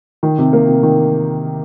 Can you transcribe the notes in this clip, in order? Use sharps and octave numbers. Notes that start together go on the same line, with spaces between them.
D#3
C3
A#3
C3
D#3